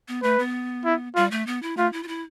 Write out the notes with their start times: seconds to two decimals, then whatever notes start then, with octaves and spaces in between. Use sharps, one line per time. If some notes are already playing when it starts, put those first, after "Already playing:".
0.08 B3
0.23 A3 B4
0.39 B3
0.85 E4
1.15 G3 F4
1.31 A3
1.47 B3
1.62 E4
1.77 A3 F4
1.93 E4
2.03 F4
2.08 E4